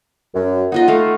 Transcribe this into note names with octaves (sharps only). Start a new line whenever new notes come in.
F#2
D#4 F4 D#5 F#5
A3 F5